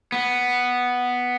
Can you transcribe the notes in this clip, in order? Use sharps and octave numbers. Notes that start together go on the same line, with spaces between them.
B3